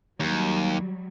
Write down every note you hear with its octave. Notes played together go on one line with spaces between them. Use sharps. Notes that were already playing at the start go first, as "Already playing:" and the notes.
D#2 F#3 G3